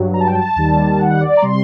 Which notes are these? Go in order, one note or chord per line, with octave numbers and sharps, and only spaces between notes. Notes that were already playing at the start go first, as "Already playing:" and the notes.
Already playing: G2 F#3
A#5
A5
G5
A5
D#2 D#3 G3
F#5
D5
A#5
C3 G3 C6